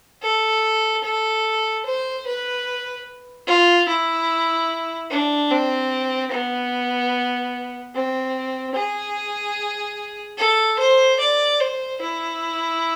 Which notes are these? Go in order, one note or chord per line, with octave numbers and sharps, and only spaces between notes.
A4
A4
C5
B4
F4
E4
D4
C4
B3
C4
G#4
A4
C5
D5
C5
E4